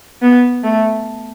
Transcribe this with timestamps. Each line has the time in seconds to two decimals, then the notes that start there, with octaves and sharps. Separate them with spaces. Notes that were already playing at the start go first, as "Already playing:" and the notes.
0.22 B3
0.63 A3